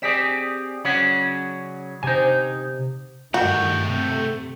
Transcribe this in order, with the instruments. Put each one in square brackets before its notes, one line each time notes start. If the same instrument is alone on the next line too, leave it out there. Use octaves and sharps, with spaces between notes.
[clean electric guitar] C4 G4 G#4 [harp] D5 B6 E7
[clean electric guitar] C#3 F#3 C#4 [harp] F#5
[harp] C3 [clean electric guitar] D#4 G#5
[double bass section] G2 D#3 [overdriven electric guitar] A3 G5 [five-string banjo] F#4
[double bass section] C3